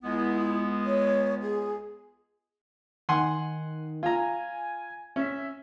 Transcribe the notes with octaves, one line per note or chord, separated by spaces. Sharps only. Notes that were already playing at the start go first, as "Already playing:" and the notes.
C#2 G#3 B3 E4
C#5
G#4
D#3 F#5 G#5 C6
F4 G#5 A#5
C#4 E5